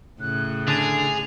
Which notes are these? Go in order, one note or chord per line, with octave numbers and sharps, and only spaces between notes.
A2 C#3 F#6
D3 D4 G#4 F7